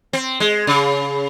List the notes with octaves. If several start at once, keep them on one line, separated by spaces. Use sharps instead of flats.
C4
G#3
C#3